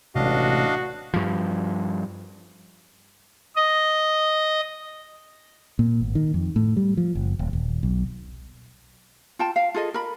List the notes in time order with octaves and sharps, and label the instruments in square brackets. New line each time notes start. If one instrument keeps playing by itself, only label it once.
[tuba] A1 [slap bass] C3 G#3 A3 [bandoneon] D4 D#5 F5 [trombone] F#4
[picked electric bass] G2 F3
[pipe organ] D#5
[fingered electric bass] A#2
G#1
D#3
F2
A2
G3
F3
F#1
D#1
D#1
B1
[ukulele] F4 G5 A5
F5
F4 G#4 A4 D#5
A#4 B5